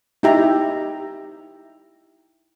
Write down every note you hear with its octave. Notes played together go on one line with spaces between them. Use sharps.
D#4 E4 G4 E5 A#5